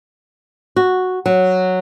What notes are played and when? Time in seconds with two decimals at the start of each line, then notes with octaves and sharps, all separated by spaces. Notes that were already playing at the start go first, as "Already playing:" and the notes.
0.76 F#4
1.26 F#3